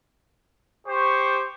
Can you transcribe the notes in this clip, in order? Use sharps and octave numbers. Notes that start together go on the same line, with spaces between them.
G4 C5 C#6